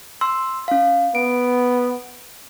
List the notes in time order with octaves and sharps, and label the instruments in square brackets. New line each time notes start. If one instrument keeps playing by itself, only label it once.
[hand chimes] C6 E6
C#4 F5
[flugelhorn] B3 [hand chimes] D7